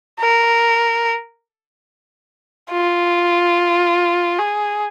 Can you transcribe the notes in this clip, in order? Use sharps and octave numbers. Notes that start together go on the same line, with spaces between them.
A#4
F4
G#4